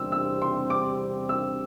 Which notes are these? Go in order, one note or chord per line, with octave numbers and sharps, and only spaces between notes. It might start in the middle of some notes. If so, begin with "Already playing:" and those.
Already playing: E2 C3 G3 C4 E6
E6
C6
D6
E6